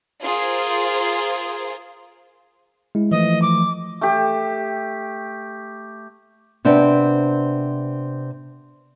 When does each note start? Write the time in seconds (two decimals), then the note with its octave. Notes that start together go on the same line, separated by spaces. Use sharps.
0.21 F4 G#4 A#4 C5
2.95 G#3 E4
3.11 E3 F3 A3 D#5
3.42 D6
4.01 A3 G4
6.65 C3 B3 C4 D4